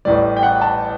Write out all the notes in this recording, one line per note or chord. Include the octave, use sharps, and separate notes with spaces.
A1 A2 G3 D5
G5
F#5
A5